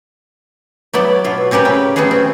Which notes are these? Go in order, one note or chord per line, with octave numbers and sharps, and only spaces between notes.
F#3 B3 E4 D5
B2 F#3 F4
C4 C#4 G4 A#4 B4
C#3 G5
F#3 A3 B3 C#4 F#4 G#4
C4